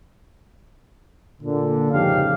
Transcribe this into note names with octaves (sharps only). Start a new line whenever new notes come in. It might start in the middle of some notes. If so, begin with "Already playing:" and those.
A#2 D3
F2 G#2 C#3 G4 F5